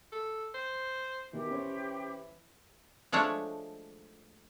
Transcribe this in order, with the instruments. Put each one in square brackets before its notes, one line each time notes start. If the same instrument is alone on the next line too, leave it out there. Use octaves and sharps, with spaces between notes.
[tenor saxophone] A4
C5
[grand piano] B2 D#3 [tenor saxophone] E3 [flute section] G4
[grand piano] C#4 C5 C#5
[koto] F3 G#3 A3 D4 C#5